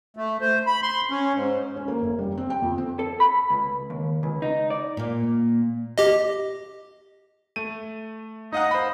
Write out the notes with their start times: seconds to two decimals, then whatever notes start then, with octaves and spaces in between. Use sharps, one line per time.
0.17 A3
0.41 C5
0.67 B5
0.82 C6
1.11 C#4
1.34 G#2
1.76 C#4
1.88 A#3
2.02 F#1
2.19 G3
2.38 C4
2.50 G5
2.62 F2
2.78 C4
2.99 A4
3.20 B5
3.50 C#2
3.90 D#2
4.23 C#2
4.42 D#4
4.70 D5
4.97 A#2 A#3
5.98 G4 D#5
7.56 A3 D#7
8.52 D#4 D#5 F5 F#5
8.71 C5 B5